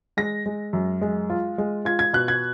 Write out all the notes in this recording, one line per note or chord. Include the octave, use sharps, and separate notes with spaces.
G#3 A#6
G#3
F#2
G#3
F4
G#3
F4 G#6
G#6
B2 F#6
G#6